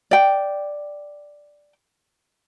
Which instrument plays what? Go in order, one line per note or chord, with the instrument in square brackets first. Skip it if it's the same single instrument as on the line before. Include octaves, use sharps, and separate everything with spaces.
[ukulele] D5 G5